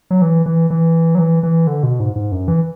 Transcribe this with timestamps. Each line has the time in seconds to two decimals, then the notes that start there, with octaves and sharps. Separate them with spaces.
0.11 F#3
0.22 E3
0.46 E3
0.70 E3
1.15 F#3
1.19 E3
1.43 E3
1.67 D3
1.83 B2
2.00 G#2
2.16 G#2
2.32 F#2
2.48 E3